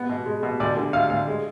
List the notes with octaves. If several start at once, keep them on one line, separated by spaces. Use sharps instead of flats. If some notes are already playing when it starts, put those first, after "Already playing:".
Already playing: B3
B2
G#3
B2
D2 D5
D3
D2 F5
D2 F5
G#3